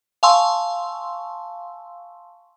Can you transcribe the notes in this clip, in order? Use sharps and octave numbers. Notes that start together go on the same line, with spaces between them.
F5 G#5 A5 C6 C#6 E6